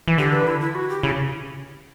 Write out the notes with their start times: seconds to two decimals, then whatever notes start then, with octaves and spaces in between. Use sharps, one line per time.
0.08 E3
0.18 D3 G4
0.32 B4
0.47 E4
0.61 E4
0.75 F#4
0.89 G4
1.03 C#3 E4